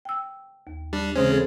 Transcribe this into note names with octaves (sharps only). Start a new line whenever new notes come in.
G5 E6
D#2
G3 D4
C#3 E3 G#3 C4 C#4 C5
G#4 A4 C5